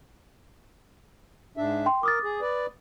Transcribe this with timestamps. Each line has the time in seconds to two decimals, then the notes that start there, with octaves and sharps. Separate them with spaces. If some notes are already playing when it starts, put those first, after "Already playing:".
1.57 G#2 D4 E5
1.86 G5 C6
2.03 A#4 D6 D#6 A6
2.24 G#4
2.41 B4 D5